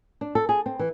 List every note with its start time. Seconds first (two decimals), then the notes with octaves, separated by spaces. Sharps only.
0.21 D4
0.35 A4
0.49 G#4
0.66 C4
0.79 E3